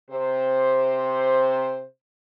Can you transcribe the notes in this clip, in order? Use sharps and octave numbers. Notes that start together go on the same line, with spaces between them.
C3 C5